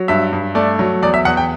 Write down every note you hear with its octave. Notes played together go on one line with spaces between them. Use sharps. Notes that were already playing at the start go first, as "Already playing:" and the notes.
Already playing: F#3
G2 E5
G2
A3 D5
F#3
E2 D5
E5
E2 F#5
G5